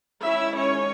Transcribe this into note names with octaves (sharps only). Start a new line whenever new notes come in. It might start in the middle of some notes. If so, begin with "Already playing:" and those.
D#3 G#3 C#4 E4 E5
C#4 C#5